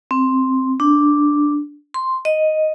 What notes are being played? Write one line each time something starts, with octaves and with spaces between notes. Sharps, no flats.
C4
D4
C6
D#5